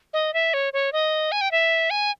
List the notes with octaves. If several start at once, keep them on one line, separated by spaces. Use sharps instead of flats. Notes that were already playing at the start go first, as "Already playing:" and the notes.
D#5
E5
C#5
C#5
D#5
G#5
G5
E5
G#5